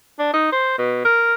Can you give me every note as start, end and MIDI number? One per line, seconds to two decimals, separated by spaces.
0.19 0.29 62
0.34 0.51 63
0.52 0.76 72
0.78 1.02 47
1.05 1.35 70